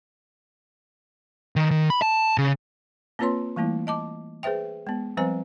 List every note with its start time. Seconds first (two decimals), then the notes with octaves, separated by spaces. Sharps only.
1.56 D#3
1.71 D#3
1.90 B5
2.02 A5
2.38 C#3
3.19 A#3 C4 F4 B4 C#5 C6
3.56 E3 G3 A3 A#3 E4
3.87 D#5 A5 D6
4.43 G#4 B4 C5 E5 G5
4.87 G#3 B3
5.17 F3 G3 C4 B4 C5 G#5